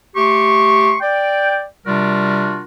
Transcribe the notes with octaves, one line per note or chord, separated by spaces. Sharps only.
A3 G4 C6 C#6
D5 G5
C3 G3 D4 F4 F#4 A#4